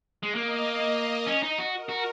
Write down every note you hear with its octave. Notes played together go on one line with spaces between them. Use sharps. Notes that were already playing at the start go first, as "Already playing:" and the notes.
G#3
A#3 D#5
C#4
D#4
F#4
A#4
F#4